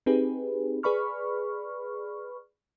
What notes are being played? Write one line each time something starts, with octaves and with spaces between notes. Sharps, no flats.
C4 D#4 G4 G#4 B4
G#4 B4 D5 B5 C#6 F6